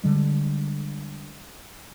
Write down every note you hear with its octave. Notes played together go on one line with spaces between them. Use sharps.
D3 G3 G#3